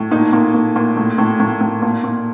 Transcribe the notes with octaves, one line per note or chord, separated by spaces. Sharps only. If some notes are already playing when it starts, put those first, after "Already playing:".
Already playing: A2
A#2 D#4
A#2
A#2
A#2
A2
A2
A2
A2
A#2
A#2